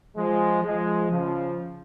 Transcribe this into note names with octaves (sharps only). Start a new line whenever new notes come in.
F3 G#3
F3 G#3
C#3 F3